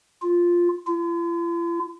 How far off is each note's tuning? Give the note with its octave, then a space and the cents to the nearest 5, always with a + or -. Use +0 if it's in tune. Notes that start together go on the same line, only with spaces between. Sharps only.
F4 +0
F4 -45